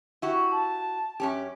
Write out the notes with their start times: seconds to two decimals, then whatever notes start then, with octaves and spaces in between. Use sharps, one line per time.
0.22 E4 F#4 G4
0.52 A5
1.20 F#2 C#4 G4